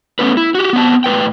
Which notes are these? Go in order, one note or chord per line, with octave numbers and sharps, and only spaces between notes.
A3 B3 C#4 F4 B4
E4
F#4 G4
B3 C4 E5 A5
A2 B4 G5